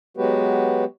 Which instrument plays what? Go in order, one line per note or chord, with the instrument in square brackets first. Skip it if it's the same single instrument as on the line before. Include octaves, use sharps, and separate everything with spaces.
[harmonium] F#3 G#3 B3 F#4 G4 B4